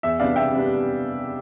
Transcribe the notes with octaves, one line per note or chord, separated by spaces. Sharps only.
E2 E5
C3 G3 B3 D4 D5 F5
E2 E5 G5
C3 G3 B3 D4